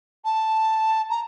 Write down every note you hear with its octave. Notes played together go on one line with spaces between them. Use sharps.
A5
A#5